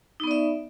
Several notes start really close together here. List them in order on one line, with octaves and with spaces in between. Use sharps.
D#4 B3 D5 E5